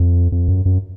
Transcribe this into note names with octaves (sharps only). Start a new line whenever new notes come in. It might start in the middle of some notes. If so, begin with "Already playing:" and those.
Already playing: F2
F2
F#2
F#2